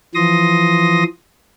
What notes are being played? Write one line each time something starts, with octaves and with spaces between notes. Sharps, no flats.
E3 F3 C6 D#6 A#6